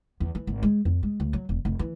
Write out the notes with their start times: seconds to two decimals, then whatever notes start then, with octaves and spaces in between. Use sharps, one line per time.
0.20 E2
0.35 E3
0.47 G#1
0.63 G#3
0.85 F2
1.03 G#3
1.20 D2
1.33 F#3
1.49 E1
1.65 F1
1.79 E3